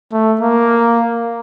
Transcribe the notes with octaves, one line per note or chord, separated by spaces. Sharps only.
A3
A#3